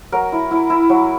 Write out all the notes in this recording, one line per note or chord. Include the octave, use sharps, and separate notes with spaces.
F#3 A#4
E4
E4
E4
F#3